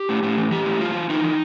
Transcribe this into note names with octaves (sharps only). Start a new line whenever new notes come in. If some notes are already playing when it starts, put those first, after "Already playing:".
Already playing: G4
A2
A2
E3
E3 G4
A2
E3 F4
E3
E3 D#4
E3